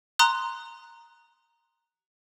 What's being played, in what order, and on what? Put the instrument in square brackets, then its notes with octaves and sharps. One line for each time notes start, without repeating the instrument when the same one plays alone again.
[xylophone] A#5 C6 D#6 F#6